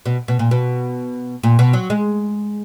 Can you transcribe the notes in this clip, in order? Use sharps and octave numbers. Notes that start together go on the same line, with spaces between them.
B2
B2
A#2
B2
A#2
B2
F#3
G#3